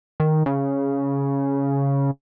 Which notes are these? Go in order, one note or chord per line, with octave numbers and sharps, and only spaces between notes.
D#3
C#3